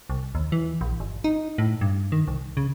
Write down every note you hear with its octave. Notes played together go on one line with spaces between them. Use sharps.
C2
D#2
E3
A#1
G1
D#4
A2
G2
D#3
C2
C#3